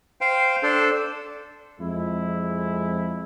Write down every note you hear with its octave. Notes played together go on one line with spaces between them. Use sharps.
C5 F5 G5
D4 A4 C5
F2 G#3 E4